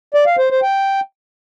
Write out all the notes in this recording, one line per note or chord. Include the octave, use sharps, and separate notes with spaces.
D5
F5
C5
C5
G5